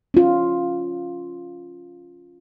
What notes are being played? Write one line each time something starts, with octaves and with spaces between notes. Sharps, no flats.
C#4 F4